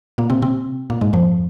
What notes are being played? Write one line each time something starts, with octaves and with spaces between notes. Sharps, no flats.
A#2 A#3
C3 C4
C3 C4
A#2 A#3
G#2 G#3
F2 F3